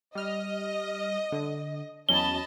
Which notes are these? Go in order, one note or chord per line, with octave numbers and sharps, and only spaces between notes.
G3 D#5 F6
D3
E2 F#3 C#4 D#5 A5 B5 G7